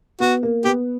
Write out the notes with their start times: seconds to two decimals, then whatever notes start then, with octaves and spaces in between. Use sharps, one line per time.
0.20 B3 F#4
0.43 A#3
0.64 B3 G4